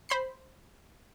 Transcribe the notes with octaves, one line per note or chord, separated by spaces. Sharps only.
C5 B5 C7